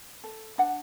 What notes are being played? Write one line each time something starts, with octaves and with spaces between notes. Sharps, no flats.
A4
D4 F#5